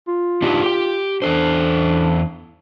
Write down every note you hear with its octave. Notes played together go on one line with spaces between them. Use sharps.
F4
D4 D#4 G4
G4 G5
E2 D4 A4 C5